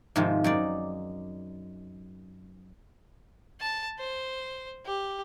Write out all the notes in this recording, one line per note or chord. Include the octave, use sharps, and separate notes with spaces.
G#2 C3 D#3 F3
F#2 D#4 D5
A5
C5
G4